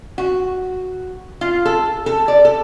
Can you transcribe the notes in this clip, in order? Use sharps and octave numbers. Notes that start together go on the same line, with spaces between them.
F#4
F4
A4
A4
D5
A4